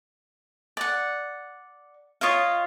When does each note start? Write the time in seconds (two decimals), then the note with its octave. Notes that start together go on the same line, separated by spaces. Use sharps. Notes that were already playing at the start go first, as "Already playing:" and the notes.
0.77 D5 F#5
2.21 F4 C#5 D#5 F5